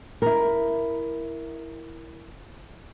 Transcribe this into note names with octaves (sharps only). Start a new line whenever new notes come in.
E4 A#4